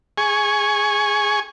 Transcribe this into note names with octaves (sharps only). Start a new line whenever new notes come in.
G#4 G#5 C#6